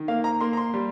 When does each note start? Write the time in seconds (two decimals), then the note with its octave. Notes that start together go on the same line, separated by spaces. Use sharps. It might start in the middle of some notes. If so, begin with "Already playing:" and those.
Already playing: D#3
0.08 A#3 F5
0.24 A#5
0.40 A#3 C6
0.53 A#5
0.57 C6
0.74 G3